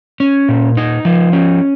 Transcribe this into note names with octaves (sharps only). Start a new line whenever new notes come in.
C#4
A#2
D#4
F3
C#4